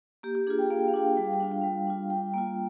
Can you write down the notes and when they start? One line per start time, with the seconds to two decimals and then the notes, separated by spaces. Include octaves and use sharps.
0.23 A#3 G4
0.35 G4
0.47 D4 F4 G#4
0.59 G5
0.70 A#3 F5
0.79 G5
0.88 F5
0.93 D4 F4 G5
1.07 F5
1.16 G3 G5
1.25 F5
1.33 G5
1.40 D4 F4 F5
1.52 G5
1.61 G3 F5
1.87 D4 F4
2.10 G3 G5
2.34 A#3 F4